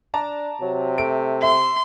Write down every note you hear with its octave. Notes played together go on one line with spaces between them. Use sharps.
D4 D5 A5 A#5
C3 F#3
A3 D7
E5 C6